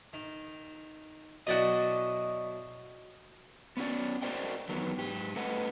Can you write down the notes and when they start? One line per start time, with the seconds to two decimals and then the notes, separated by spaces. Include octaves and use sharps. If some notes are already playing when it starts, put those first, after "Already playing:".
0.13 D#3
1.47 B2 F#3 E4 F#4 D5 D#5
3.77 B3 C#4 F#4 D5
4.22 F#4 A#4 C5 D5 D#5 G5
4.69 E2 D#3 F#3 B3
4.97 G#2 G4
5.36 A3 A4 B4 D#5 F#5